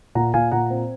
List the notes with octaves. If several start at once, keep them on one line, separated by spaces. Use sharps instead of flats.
A#2 F#5 A#5
A#2 F5 G#5
A#2 F#5 A#5
C4